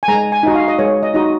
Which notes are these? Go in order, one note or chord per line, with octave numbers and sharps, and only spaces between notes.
G#5
G#3 A#5
G#5
D#4 F#4 D#5
F5
D#5
G#3 C#5
D#5
D#4 F#4 D#5